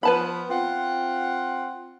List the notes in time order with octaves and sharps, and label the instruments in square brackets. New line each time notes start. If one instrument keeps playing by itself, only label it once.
[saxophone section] F3 B3 [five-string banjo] B4 A5 B5
[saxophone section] C4 F4 F#5